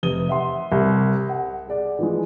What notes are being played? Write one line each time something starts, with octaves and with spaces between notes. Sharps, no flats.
F1 C3 B4 D#6 D#7 G7
E5 F#5 C6
C2
F#5
G#4 D5
E3 F3 G#3